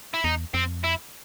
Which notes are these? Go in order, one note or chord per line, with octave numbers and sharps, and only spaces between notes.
E4
E2 D#4
F2 C4
E4